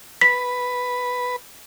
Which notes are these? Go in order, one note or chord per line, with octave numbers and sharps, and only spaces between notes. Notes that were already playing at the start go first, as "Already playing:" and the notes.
B4 B6